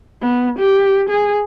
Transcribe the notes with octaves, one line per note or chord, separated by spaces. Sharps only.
B3
G4
G#4